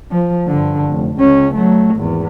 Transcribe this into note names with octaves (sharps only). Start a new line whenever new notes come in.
F3
G2 D3
F1
C#2 C#4
F#3 A3
G#1 E2